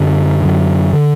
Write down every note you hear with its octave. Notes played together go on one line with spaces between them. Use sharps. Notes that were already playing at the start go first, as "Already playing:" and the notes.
Already playing: F#2 D3
F#2 D3
D3